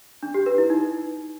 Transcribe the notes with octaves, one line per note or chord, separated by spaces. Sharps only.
D4
G4
B4
E4
D#4